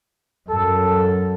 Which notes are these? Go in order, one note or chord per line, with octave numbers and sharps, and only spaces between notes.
F#2 A4